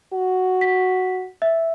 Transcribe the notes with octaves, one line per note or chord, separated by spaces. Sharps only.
F#4
B6
E5